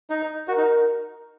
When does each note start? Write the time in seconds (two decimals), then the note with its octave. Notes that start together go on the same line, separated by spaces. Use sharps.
0.10 D#4
0.48 F#4 A#4
0.58 D#4